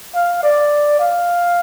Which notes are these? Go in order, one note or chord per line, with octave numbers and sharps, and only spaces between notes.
F5
D5
F5